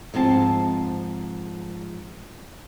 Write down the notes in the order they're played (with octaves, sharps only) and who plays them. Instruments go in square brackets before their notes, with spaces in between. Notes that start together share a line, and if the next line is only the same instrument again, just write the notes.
[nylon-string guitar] G#2 F3 C4 A5